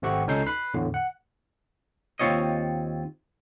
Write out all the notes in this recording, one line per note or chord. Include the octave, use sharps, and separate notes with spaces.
G#1 A3 C4 G4 F#5 C#6
C#2 C#4 D#4 A4 G6 C7
B5 F#6 C7
E2 A2 D3
F#5
D#2 C4 F4 C#5 D#5